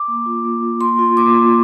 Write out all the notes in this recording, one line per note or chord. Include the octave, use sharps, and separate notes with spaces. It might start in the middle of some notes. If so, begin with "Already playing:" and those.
Already playing: D6
A#3
F4
A#3
F4
A#3 C6
F4
A#3 D6
F4